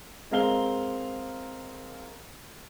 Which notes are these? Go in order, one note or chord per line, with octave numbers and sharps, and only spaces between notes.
G#3 C4 A#4 F5 G7